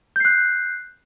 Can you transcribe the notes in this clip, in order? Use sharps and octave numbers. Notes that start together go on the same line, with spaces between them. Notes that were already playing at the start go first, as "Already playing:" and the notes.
F#6 G6 C7